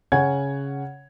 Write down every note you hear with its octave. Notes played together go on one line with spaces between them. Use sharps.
C#3 C#5 F#5 G#5 G#6